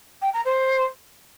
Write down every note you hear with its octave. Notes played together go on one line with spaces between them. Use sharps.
G5
A#5
C5